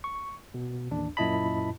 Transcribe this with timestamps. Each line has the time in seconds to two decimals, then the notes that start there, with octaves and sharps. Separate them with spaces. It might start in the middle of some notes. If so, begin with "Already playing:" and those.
0.04 C#6
0.54 B2
0.91 A1 D#2 D4
1.17 F#2 A#2 E4 D#5 A5 B5